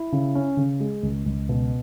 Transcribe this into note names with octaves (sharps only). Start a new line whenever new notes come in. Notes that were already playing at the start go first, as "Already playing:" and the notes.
Already playing: E4
C#3
C#4
C#3
G#3
C#2
C#2
B2